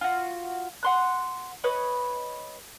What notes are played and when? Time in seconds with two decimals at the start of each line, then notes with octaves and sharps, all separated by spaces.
0.01 F4 F#4
0.83 F#5 C6 F#6
1.64 B4 C#5 D#5 B5